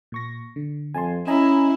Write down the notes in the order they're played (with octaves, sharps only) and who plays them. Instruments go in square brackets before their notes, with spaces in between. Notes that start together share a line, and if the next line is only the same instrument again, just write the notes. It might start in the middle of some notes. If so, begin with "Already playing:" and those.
[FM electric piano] A#2 C#6 A#6
D3
[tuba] F2 [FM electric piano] G#5 A5 C6
[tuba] C#4 [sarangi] E4 [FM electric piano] D#5 G#5 A#5